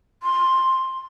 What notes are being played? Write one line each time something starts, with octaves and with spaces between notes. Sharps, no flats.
C6